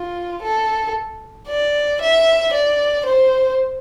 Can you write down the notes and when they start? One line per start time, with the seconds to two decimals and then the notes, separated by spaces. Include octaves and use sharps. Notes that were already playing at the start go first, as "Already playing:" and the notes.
Already playing: F4
0.43 A4
1.48 D5
2.01 E5
2.53 D5
3.06 C5